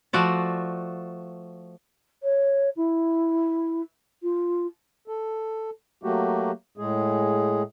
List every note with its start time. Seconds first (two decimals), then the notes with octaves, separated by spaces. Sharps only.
0.13 F3 A3 F#4 D5
2.23 C#5
2.76 E4
4.23 F4
5.08 A4
6.03 F#3 A3 A#3 F#4 G4
6.78 A2 G#3 G#4